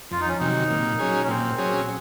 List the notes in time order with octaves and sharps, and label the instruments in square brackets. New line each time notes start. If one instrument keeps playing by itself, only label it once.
[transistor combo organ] F2 [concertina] F4
[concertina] D#4
C#4
[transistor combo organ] C3 D#3 F#3 [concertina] D#4
[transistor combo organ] A#2
F#3 C#4 G#4
[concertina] C#4
[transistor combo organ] A#2 [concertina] C4
[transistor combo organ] F#3 C#4 G#4